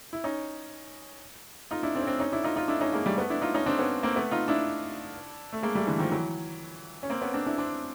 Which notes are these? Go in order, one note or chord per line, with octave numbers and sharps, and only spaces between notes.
E4
C#4 D#4
D#4 F4
D4 E4
C4 D4
C#4
C4 D4
C#4 D#4
D4 E4
D#4 F4
D#4 F4
D4 E4
C#4 D#4
G#3 A#3
G3 A3
A3 B3
D4 E4
D#4 F4
C#4 D#4
C4 D4
B3 C#4
A#3 C4
A3 B3
D#4 F4
D4 E4
A3
G#3 A#3
G3 A3
D3 E3
D#3 F3
E3 F#3
C#4
A#3 C4
B3 C#4
C4 D4
D4 E4
C4 D4